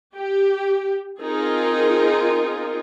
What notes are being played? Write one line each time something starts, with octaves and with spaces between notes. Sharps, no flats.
G4
C4 D#4 F4 G#4 A#4